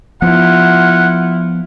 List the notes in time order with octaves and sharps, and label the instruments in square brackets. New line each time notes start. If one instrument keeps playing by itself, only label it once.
[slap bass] F3 B3 [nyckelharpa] E4 F4 [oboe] F#5